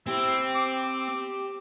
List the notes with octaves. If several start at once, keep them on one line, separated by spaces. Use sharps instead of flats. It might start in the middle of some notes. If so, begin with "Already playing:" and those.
C4 E4 G4
D6